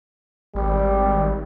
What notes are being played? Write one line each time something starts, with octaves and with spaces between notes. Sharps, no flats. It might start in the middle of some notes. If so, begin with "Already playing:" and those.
G#1 G3